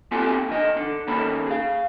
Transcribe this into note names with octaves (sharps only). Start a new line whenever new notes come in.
A#3 C4 F4 G4 A4 G#5
D3 E3 D#5
D3
D#2 D#3 A#3 C#4 A4 B5
G#4 F5